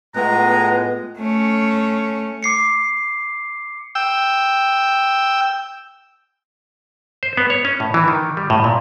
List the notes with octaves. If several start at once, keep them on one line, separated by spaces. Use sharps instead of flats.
A2 G#3 B3 F4 B4 F#5 A#5
A3 C#4
D6 C7 C#7
G5 E6
C5
B3
C#5
C#4
A2
E3
D#3
G3
A2
A#2